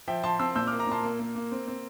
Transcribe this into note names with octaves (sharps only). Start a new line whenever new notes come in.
F3 E5 G5
F3 A5 C6
C4 C6 E6
A#2 E6 G6
A#3 D6 F6
A#5 D6
A#2 A5 C6
A#3
A#3
A#3
C4
C4